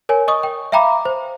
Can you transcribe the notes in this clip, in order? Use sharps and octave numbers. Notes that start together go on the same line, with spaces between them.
A#4 C#5 G#5
D#5 C#6 D#6
G5
E5 F5 G5 A#5 B5 D6
C5